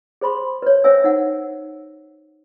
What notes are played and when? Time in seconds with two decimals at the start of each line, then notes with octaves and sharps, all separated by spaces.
0.21 G#4 C5 B5 C6
0.62 B4 C#5
0.84 C#4 C5 C#5 E5 G#5 E6
1.04 D#4 F#5